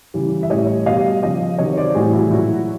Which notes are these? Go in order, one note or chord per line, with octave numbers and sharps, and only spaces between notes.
C#3 E3 G3
E5
A2 E3 G3 C#5 D#5
B2 G3 D#5 F5
C#3 F3 D#5 F5
C3 D#3 F#3 C#5 D#5
C5 D5
A2 E3 G3 F#4 G#4
E4 F#4
A#2 F#3 E4 F#4